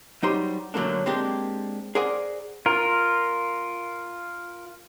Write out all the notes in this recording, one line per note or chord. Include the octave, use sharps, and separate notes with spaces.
F#3 G3 D#4 G4 C5 C6
F#2 D3 F#3 A3 A#3 D4
G#3 A#3 C4 D4 G4
G#4 A#4 C5 D5 F#5 G#5
F4 A#4